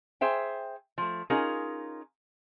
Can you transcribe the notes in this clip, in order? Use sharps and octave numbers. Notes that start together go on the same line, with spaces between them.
G#4 C5 E5 G5
F3 A3
C#4 D#4 F4 G#4 A#4